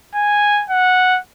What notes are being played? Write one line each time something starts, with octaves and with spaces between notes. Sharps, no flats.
G#5
F#5